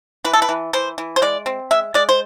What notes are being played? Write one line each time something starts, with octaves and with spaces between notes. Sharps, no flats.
E3 B4
A4
B4
E3
E3 C5
E3
C5
G#3 D5
C4
G#3 E5
G#3 D5
C5